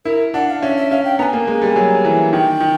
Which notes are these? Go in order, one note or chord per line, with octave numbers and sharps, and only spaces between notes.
E4 A#4
D4 F#5
F5
C#4 E5
E5
C#4 F5
G5
B3 A#5
G#5
A#3
G#3
G3
F#3
E3
D#3 G5
D#3